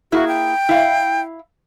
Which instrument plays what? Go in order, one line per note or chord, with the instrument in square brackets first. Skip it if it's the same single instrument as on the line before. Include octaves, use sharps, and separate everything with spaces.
[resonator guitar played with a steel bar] A#3 E4 G#4 [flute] F#4
[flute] G5
[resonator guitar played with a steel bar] E4 F5